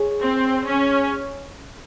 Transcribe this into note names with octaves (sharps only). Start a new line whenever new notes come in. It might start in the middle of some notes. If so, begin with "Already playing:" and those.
Already playing: G#3 G#4 C#5
C4
C#4